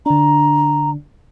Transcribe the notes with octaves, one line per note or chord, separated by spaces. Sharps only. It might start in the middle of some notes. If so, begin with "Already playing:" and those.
D3 D4 A#5